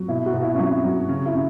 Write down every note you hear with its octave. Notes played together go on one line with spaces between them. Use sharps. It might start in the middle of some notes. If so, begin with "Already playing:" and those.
Already playing: F#3
B2 E4
F#4
B2
E4
C#4
F#3 E4
F#3
C#3 C#4
E4
C#3